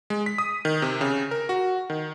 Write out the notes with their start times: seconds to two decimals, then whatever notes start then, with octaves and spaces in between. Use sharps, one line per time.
0.10 G#3
0.26 B6
0.38 D#6
0.65 D#3
0.82 C3
1.01 C#3
1.31 A#4
1.49 F#4
1.90 D#3